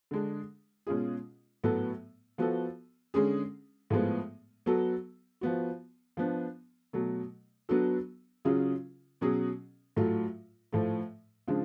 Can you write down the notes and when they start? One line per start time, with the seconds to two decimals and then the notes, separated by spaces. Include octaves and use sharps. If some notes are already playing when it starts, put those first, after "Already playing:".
0.11 D3 G#3 D4
0.87 B2 G#3 C#4 F4 G#4
1.64 A2 F#3 B3 F#4 A4
2.38 F3 B3 F#4 A4
3.14 D3 G#3 C#4 G#4
3.90 A2 F3 G#3 B3
4.66 F#3 B3 F#4 A4
5.41 F3 B3 F#4
6.17 F3 B3 D4
6.93 B2 F#3 A3
7.69 F#3 B3 D4 F#4 A4
8.45 C#3 F#3 C#4 F4 G#4
9.21 B2 F#3 C#4 G#4
9.96 A2 F#3 A3 F4
10.72 A2 F3 A3
11.48 C#3 F3 G#3 D4 F4